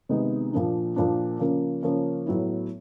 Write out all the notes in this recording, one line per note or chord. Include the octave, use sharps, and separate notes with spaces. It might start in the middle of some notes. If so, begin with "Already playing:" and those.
C3 D#3 G#3 B3 D#4
A#2 F3 A#3 D4
A#2 F3 A#3 D4
C#3 F3 A#3 C#4
C#3 F3 A#3 C#4
A2 F#3 B3 E4